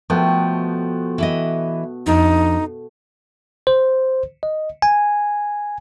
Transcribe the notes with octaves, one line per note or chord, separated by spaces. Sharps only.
B2 F3 A3 G5
E3 E4 D#5
F2 D4 D#4
C5
D#5
G#5